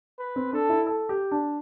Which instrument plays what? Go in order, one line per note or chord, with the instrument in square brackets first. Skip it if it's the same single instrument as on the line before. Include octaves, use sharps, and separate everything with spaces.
[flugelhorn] B4
[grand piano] C4
[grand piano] D4 [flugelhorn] A4
[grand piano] E4
A4
G4
D4